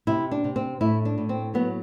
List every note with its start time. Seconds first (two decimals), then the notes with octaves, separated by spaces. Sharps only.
0.07 C3 E4
0.31 D4
0.44 C3
0.56 C4
0.81 A2 E4
1.05 D4
1.18 A2
1.29 C4
1.54 F#3 B3